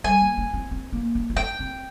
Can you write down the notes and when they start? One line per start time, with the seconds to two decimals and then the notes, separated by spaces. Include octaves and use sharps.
0.04 G3 G#5
0.21 A#3
0.38 D4
0.54 C4
0.71 C4
0.92 A#3
1.15 D4
1.30 D#4
1.36 D4 G5
1.59 C4